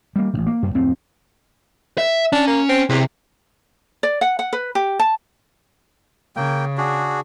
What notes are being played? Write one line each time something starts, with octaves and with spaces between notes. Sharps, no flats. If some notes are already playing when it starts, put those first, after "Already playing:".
G3 A#3
A1 C#3
A#3
F#2
D1 F2 A2 C4
E5
C#4 D4
A#3
C4
E2 C3
D5
F#5
F#5
B4
G4
A5
C#3 A#3 G5
D4 F#4 G#4